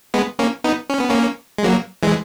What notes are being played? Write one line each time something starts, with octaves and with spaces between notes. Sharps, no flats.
G#3 B3
A#3 C#4
B3 D#4
C#4
B3
A#3 C#4
G#3
F#3 A#3
E3 G#3